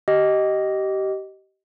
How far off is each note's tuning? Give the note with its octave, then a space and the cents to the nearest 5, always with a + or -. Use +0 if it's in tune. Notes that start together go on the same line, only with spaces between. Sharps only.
G4 -25 D#5 +0